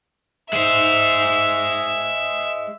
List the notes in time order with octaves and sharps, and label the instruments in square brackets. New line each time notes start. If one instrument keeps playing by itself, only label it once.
[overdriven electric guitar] G#3 C5 [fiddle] E5